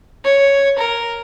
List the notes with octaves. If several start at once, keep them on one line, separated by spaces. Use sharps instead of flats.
C#5
A#4